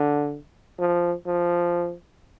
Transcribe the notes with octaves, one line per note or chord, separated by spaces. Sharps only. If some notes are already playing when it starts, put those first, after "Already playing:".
Already playing: D3
F3
F3